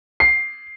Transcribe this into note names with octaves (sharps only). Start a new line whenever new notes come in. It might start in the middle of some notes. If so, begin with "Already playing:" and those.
C7